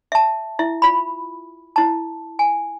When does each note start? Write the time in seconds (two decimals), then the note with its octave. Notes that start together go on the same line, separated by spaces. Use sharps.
0.12 E5 A5
0.59 E4 E5
0.82 F4 B5
1.76 E4 A5
2.39 G#5